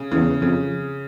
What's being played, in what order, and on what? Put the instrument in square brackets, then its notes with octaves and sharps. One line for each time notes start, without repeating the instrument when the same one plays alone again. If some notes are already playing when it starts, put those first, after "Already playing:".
Already playing: [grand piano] C#3
[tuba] E2 [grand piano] C#3
[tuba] F2 [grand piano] C#3